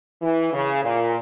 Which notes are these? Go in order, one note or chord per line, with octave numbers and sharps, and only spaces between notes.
E3
C#3
A#2